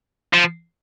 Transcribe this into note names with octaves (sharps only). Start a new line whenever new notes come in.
F3